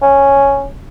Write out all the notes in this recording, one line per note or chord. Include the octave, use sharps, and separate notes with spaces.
C#4